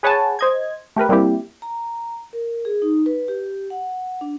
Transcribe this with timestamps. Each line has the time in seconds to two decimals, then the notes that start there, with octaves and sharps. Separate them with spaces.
0.03 G#4 B4 C#5 F#5 G#5 A5
0.39 C5 D#5 G#6
0.96 A3 G4 A#4 B4
1.09 G3 A#3 C4 E4 G4
1.62 A#5
2.33 A#4
2.65 G#4
2.82 D#4
3.06 B4
3.28 G4
3.70 F#5
4.21 D4